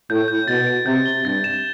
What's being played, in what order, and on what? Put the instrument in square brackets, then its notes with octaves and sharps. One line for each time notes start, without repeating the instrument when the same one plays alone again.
[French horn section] A2 [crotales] G6
[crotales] G6
[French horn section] B2 [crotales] A6
[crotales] D7
[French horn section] C3 [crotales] G6
[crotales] G7
[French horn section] G2 [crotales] A6
[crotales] E7